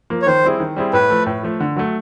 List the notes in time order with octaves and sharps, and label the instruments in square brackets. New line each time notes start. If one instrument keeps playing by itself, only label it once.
[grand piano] F3 A#3
[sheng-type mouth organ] C#5
[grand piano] D#3 [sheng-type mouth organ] C5
[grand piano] G3 C4 E4 G#4
D#3
G3 C4 E4 G#4
[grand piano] A2 [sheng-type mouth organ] B4
[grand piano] F3 A3
A2
F3 A3
D3
F#3 A3